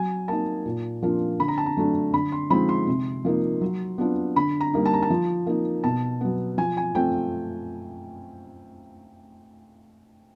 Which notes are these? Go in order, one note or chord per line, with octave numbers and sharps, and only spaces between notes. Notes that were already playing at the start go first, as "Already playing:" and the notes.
Already playing: F#3 G#5
A#3 D#4 A5
A#2
F3 A#3 D4 F4
D3 B5
A#5
A5
A#5
F#3 A3 D4
D3 B5
C6
F3 G#3 C4 D#4 B5
C6
C3
F3 A#3 D#4
F#3
B3 D4 F4
D3 B5
A#5
G3 A#3 D#4
A5
A#5
A5
F3
A#3 D#4
B2 A5
F#3 B3
F3 G#5
G#5
A3 C4 F4 G5